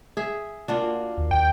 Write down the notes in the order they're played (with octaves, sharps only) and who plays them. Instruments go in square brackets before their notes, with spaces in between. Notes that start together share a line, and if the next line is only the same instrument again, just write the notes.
[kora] G#4 E5
[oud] A#3 F4 F#4 [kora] D4
[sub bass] D#2
[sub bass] D#2 [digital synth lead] G5